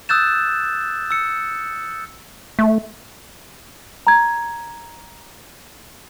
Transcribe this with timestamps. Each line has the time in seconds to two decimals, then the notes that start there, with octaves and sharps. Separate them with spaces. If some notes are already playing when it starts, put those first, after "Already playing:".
0.09 D#6 E6 F#6 G6 A6 E7
1.11 E6 C#7
2.59 A3
4.07 A#5 G#6